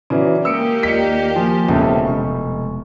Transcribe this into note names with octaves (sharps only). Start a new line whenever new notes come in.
C#3 E3 F#3 D5 D6
G#3 A#3 G4 A#4 D#6 E6 C#7 D7
D#2 F4 D5 D#5 B6 C#7
F3 G#5
E1 C#2 C#3 A3 C5 B5
F1 G#3 C#6